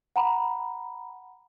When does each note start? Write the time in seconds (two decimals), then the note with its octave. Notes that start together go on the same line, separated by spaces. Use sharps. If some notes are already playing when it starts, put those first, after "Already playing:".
0.16 F#5 A#5 B5